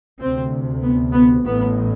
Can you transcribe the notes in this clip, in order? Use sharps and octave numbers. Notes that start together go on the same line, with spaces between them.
D2 C3 C4
B3
B3
A1 A2 B3